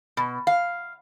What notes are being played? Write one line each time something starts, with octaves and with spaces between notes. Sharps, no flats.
B2
F5